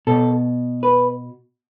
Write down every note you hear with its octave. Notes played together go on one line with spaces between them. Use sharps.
B2 A4
B4